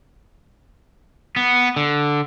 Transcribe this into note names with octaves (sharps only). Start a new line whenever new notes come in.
B3
D3